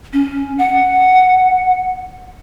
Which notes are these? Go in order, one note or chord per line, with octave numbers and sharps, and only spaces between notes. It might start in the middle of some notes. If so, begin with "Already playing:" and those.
C#4
F#5